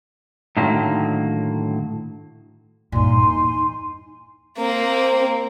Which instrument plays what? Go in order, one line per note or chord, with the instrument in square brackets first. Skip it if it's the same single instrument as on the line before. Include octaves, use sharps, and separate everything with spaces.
[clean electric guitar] A2 D3 D#3 F#3 A#3
[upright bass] G2 A#2 [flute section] D#4 G#5 C6
[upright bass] E2
[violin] A#3 C4